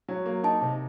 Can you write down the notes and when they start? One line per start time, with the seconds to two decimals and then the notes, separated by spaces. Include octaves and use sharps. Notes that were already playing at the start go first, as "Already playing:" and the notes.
0.08 F#3
0.26 A#3
0.43 D#4 A5
0.61 C3